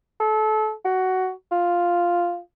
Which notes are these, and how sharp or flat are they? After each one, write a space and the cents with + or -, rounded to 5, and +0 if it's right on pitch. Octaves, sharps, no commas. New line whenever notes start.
A4 -30
F#4 +10
F4 +0